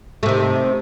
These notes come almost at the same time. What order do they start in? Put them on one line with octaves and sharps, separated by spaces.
A3 C3 D#3